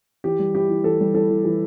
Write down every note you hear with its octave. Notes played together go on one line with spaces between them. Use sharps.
E3 G4
G3
E4 G4
E3
E3 A4
G3
E4 A4
E3
E3